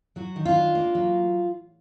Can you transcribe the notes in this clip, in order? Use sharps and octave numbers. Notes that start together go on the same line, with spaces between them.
F#3 F#4
D#3
F4
D4
A#3
F#3